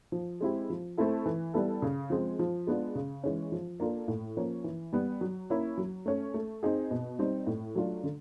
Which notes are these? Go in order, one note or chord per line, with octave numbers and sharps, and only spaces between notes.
F3
G#3 C4 E4 G4
F3
A3 C4 E4 A4
E3
G3 B3 E4 A4
C#3
F3 G#3 C4
F3
G#3 B3 D4 F4
C#3
E3 G#3 C#4
F3
A#3 D4 F4 A4
A2
F3 A#3 C#4
E3
G3 B3
F#3
A#3 C#4 E4
F#3
A3 C#4
A3
C4 D#4 G#4
B2
G3 C4 D#4
A2
F#3 A3 D4 F4
D3